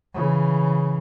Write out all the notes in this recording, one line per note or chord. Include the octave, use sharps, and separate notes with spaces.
C#3 E3